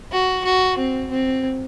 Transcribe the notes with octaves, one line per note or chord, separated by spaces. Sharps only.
F#4
F#4
C4
C4